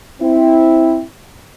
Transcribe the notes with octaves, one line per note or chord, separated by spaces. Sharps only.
C4 E4